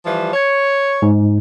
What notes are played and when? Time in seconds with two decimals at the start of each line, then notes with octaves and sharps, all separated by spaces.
0.05 E3 F3 G3
0.33 C#5
1.02 G#2